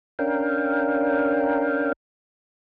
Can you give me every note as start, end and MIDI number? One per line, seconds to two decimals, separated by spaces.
0.19 1.92 61
0.19 1.92 62
0.19 1.92 70
0.19 1.92 77
0.19 1.92 79